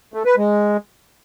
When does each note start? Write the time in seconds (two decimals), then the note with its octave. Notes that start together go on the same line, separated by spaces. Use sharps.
0.14 A3
0.25 B4
0.37 G#3